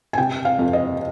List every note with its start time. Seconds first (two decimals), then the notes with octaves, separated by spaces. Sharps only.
0.13 G#5
0.18 C3 G5
0.45 F5
0.59 F2
0.73 D#5